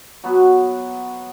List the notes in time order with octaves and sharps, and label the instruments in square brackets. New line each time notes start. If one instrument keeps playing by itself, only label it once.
[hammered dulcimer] F#3 B3